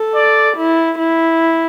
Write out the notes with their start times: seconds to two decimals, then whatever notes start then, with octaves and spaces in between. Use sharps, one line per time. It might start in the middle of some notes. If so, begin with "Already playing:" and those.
Already playing: A4
0.15 D5
0.57 E4
0.99 E4